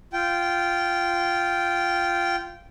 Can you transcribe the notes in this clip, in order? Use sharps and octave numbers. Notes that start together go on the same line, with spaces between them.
F4 G5